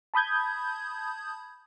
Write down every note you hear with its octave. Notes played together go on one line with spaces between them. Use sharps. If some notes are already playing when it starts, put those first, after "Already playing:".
A5 B5 D#6 G6 G#6